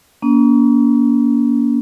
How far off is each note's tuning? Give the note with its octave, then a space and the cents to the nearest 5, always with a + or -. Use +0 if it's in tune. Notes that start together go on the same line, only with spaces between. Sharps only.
A#3 +25 C#4 +45